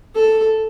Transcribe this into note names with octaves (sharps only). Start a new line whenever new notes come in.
A4